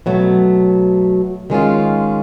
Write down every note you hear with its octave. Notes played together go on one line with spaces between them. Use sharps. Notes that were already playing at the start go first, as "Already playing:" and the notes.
B2 F#3 A3
D#3 G#3 C#4 F4